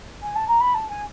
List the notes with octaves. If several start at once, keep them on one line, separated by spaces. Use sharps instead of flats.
G#5
A5
A#5
B5
A5
G#5